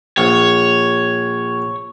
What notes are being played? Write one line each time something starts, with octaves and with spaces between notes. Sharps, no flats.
A#1 C#5